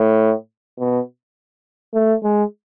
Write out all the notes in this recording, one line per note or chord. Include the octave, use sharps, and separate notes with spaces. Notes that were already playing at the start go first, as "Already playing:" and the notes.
Already playing: A2
B2
A3
G#3